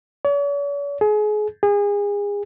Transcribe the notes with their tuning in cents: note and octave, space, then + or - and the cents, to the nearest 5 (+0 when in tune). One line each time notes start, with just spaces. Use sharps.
C#5 +45
G#4 +30
G#4 -30